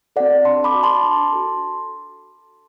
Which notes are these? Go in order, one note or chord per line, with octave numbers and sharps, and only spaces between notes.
C4 F#4 A4 D5 F#5
D4 A5 C6
B5 D6
F#4 A4
A5 C6
D4
F#4 A4